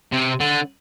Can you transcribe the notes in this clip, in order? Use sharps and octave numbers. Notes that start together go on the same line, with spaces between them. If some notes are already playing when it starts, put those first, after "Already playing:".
C3
D3